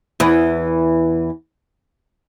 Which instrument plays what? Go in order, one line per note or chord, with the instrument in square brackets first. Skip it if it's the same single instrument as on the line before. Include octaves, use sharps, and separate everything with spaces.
[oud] E2 E3